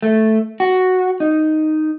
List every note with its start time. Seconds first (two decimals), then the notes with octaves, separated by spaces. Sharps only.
0.02 A3
0.60 F#4
1.20 D#4